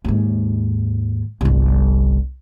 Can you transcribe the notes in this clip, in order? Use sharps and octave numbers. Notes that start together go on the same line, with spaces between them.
D#2 G#2
G1 C2